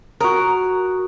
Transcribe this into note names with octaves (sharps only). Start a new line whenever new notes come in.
F#4 A#4 D#6